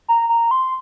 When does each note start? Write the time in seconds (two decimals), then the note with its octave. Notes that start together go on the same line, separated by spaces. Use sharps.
0.08 A#5
0.29 A#5
0.51 C6